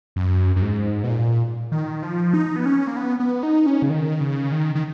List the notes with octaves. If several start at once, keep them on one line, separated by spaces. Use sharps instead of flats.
F#2
F#2
G#2
B2
A#2
D#3
F3
D#4
B3
C#4
A#3
B3
B3
D#4
C#4
C#3
D#3
C#3
D#3
D#3